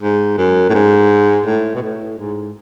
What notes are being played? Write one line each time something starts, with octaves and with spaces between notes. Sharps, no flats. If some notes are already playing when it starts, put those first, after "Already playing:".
G#2
F#2
A2
G#2
A2
B2
A2
G#2